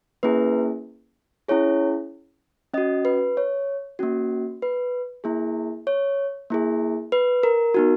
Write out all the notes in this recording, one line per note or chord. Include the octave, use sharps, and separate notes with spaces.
A#3 C#4 E4 G#4 B4
C#4 E4 G#4 C#5
C#4 F#4 D#5
B4
C#5
A#3 C#4 F#4
B4
A#3 E4 G#4
C#5
A#3 E4 G#4
B4
A#4
B3 D#4 F#4